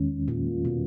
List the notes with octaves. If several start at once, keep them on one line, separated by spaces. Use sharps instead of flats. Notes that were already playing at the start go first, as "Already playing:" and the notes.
Already playing: E2 D#3 G#3 C#4
A#2
B2